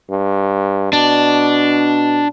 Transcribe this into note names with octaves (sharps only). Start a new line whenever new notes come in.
G2
B2 D4